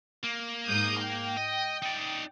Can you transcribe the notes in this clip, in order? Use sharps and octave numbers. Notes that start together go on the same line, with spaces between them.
A#3
G#2 D#6 G6
G5
D#5
D#4 D5